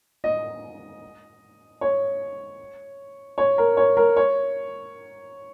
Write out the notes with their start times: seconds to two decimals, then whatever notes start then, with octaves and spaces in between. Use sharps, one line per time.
0.24 D#5
1.81 C#5
3.38 C#5
3.58 A#4
3.77 C#5
3.97 A#4
4.17 C#5